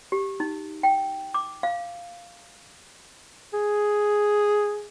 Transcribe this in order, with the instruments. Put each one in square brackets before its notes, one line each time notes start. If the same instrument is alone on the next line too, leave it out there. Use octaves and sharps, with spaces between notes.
[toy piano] G4
D#4
G5
D6
F5
[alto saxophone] G#4